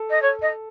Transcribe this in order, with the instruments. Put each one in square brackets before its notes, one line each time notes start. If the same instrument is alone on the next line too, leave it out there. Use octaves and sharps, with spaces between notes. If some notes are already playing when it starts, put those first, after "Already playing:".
Already playing: [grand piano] A4
[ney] D#5
C#5
D#5